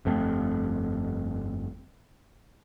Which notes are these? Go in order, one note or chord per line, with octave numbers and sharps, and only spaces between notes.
G1 F2 A3 C4